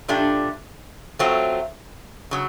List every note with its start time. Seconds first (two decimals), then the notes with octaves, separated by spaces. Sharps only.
0.08 A#2 F3 A3 D4 G4
1.19 F#3 A3 C4 F4
2.31 C#3 F#3